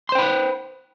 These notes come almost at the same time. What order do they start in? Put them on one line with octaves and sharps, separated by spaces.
C6 C5 G5 B5 B4